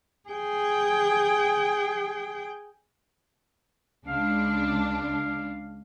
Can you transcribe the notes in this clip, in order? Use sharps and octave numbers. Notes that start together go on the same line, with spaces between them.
G#4 G5
C#2 D4 F5